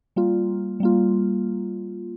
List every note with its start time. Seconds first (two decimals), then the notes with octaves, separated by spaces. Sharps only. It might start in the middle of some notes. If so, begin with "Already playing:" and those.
0.16 G3 A#3 F4
0.80 G3 A#3 F4